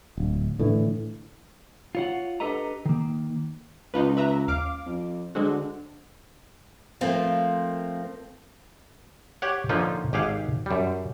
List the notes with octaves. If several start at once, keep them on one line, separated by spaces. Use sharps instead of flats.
D1
A2 D3 E3
F4 C#5 F#5
D4 G4 A4 B4 D#5 A#5
D#3 A#3
C#2 D#4 F4 B4
B4 E5 A#5
D#2 F5 D6
F2
D3 G#3 C4 F#4
F3 A3 A#3 C4
G4 C#5 F#5
D3 F3 A#3 C#4 D#4 F4
G#1 G4 G#4 F5 F#5
F#2 G3